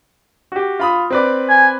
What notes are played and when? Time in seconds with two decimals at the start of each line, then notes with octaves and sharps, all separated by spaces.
0.52 F#4 G4
0.80 F4 B5 D#6
1.10 C4 B4 D5
1.49 G#5